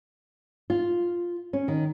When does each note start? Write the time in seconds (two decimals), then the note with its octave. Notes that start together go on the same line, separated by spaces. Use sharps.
0.70 F4
1.53 C#4
1.68 D#3